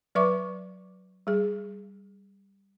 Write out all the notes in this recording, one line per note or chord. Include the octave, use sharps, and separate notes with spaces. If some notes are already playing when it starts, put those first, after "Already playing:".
F#3 B4 D5 E5 C#6 D6
G3 G#4